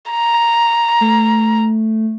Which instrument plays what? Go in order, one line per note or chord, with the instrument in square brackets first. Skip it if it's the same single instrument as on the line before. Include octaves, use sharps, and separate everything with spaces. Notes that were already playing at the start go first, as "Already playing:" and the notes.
[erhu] A#5
[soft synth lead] A3